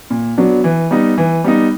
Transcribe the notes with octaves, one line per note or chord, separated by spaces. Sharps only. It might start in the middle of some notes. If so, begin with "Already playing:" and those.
A#2
F#3 B3 D4
E3
G3 B3 D#4
E3
G3 B3 D#4